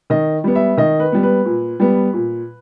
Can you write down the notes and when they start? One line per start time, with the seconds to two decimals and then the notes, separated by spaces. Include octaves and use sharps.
0.10 D#3 D#5
0.44 G3 B3
0.55 E5
0.77 D#3 D#5
1.00 B4
1.12 G3 B3
1.23 B4
1.45 A#2
1.80 G3 B3
2.13 A#2